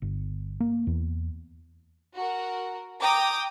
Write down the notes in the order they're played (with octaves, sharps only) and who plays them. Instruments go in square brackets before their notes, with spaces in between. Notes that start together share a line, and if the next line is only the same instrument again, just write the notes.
[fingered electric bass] G1
A#3
E2
[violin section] F#4 A#4
G5 A#5 D6 D#6